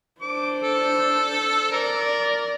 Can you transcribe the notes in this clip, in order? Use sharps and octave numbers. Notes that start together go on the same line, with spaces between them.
D4 C5 D6
A4
A#4 D5